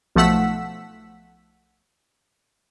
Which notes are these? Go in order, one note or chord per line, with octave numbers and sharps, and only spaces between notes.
B1 F3 A3 F#5 E6 B6